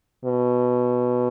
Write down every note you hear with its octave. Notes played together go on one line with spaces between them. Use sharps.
B2